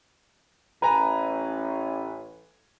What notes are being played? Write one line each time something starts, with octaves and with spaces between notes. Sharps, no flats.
A1 B4 G#5 A#5